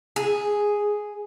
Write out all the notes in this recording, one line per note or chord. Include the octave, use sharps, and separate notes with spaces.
G#4